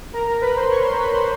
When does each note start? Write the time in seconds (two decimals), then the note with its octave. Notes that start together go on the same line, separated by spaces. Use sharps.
0.13 A#4 A#5
0.27 A#4 A#5
0.41 B4 B5
0.56 C5 C6
0.70 C#5 C#6
0.84 C5 C6
0.99 B4 B5
1.13 C5 C6